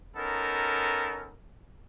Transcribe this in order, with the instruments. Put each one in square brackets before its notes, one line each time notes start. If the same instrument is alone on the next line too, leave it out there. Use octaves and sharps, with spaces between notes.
[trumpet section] B3 C#4 D#4 A4 A#4